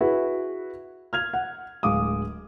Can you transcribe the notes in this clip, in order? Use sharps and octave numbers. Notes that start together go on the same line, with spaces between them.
E4 F#4 G#4 B4
F6 G#6 F7
F#5
D1 G#3 F5 D6 D#6